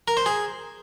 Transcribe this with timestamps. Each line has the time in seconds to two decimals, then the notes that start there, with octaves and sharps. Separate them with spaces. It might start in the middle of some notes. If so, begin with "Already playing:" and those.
0.08 A#4
0.17 C5
0.26 G#4